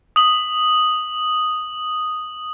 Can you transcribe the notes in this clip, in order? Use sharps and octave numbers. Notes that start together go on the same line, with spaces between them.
D#6 F#7